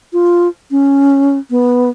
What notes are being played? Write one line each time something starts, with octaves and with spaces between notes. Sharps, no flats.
F4
C#4
B3